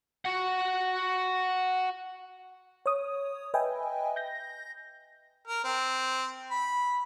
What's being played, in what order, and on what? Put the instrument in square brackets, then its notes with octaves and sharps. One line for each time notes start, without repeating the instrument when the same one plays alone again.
[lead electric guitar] F#4 F#5
[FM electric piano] C#5 D#6
B4 D#5 E5 G5 G#5
G6 A#6
[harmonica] A#4
C4
B5